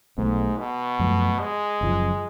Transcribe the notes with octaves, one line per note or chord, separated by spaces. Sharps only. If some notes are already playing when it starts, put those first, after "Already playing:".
B1 G#2 B2 A3
B2
F#2 F3 A3
G#3
F#1 F#2 C#3 F3